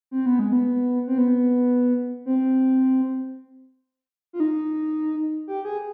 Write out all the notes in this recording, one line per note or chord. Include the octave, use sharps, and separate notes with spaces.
C4
B3
G#3
B3
C4
B3
C4
F4
D#4
G4
G#4